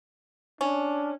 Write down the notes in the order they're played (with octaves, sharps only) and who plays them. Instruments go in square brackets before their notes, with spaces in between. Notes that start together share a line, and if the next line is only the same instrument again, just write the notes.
[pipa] C#4 [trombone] D4